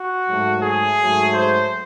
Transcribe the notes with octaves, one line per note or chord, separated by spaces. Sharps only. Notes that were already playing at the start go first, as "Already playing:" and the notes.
Already playing: F#4
G#2 F#3 A3
G#4
G#2 F#3 A3
C5